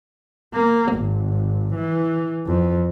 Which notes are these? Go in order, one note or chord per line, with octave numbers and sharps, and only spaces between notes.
A#3
G#1
E3
F2